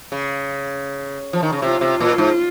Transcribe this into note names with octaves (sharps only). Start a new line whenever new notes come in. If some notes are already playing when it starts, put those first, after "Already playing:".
C#3
F3
D#3
C#3
C3 F4
C3
A#2
G#2